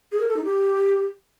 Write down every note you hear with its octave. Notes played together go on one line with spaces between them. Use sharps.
G#4
A#4
A4
D#4
G4